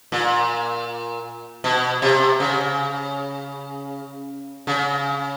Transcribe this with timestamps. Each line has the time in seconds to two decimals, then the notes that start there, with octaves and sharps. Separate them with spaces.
0.12 A#2
1.64 B2
2.02 C3
2.40 C#3
4.67 C#3